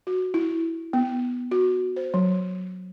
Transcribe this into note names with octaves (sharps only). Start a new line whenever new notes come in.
F#4
E4
B3
F#4
C5
F#3